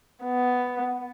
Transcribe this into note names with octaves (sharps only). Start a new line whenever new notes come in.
B3